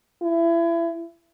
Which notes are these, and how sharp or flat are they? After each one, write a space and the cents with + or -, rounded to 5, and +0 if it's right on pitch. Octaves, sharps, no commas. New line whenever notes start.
E4 +30